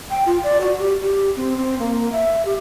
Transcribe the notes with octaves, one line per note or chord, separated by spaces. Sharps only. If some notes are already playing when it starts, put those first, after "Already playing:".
G5
F4
D5
F#4
G4
G4
C4
C4
A#3
E5
G4